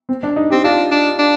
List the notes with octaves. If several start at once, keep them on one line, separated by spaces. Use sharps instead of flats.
C4
D4
D#4
C4 G4
D4 F4
D4
D4